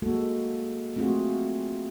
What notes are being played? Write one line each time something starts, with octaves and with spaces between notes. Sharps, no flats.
G#3 A#3 F#4 A4
A3 C4 F4 F#4 G#4